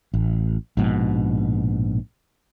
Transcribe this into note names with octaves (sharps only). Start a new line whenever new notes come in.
A1
A#1 G#2 B2